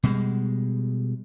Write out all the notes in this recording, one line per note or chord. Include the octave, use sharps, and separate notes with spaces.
B2 G3 G#3